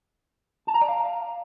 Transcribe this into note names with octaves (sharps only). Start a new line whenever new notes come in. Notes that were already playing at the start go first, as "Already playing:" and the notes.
A5
A#5
D5
F5